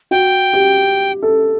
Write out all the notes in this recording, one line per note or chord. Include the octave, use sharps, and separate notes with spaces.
F#4 G5
G4
A4